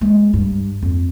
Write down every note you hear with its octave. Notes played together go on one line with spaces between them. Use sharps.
G#3
G2
F2